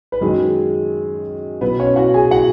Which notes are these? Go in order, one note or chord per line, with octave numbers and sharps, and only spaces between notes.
B4
F#2 D#3 F#3 G#3 G#4
B2 F#3 B3 B4
C#4 C#5
F#4 F#5
G#4 G#5
F#4 F#5